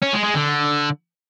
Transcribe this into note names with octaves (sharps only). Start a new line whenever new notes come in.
C#4
G#3
G#3
D3